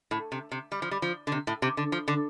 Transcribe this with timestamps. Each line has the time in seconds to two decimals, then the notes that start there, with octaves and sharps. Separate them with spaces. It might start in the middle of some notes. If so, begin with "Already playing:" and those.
0.11 A2
0.32 C3
0.52 C3
0.72 G3
0.82 F3
0.91 G3
1.02 F3
1.27 D3
1.32 C3
1.47 A2
1.62 C3
1.77 D3
1.92 F3
2.08 D3